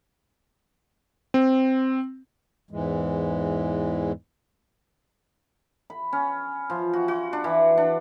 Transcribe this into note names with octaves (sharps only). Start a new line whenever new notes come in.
C4
E2 G#2 E3 G#3
B5
C#4
F3
F#4
F#4
D4
E3
D4